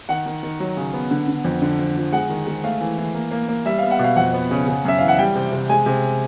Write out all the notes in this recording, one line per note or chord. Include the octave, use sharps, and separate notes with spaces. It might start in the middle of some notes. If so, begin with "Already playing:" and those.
D#3 F#5
D#3
D#3
F#3
C#3
B3
D3
D3
F2
D3
F3
F3
G#3 F#5
D#3
G#3
A3 F5
E3
E3
A#3
A#3
A#3
G3 E5
B3 F5
F#5
B2 F5
F2 F#5
B3
C#3
C#3
F#2 E5
E3 F5
F#5
G3 G5
C3
C3
G#3 G#5
C3